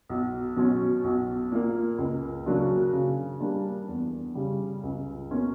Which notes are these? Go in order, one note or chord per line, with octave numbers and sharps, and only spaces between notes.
B1
B2 F#3 C#4
B1
A#2 A#3
C#2
C#3 F#3 A#3 D4
C#3
G3 A#3 D4
E2
C#3 G3
C#2
B2 A#3 C#4